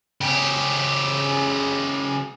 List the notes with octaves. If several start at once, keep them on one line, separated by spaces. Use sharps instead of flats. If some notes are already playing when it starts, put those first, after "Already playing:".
C#3 G4